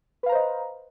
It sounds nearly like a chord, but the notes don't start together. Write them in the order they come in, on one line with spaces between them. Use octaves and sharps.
B4 F5 A#5 C5 D#5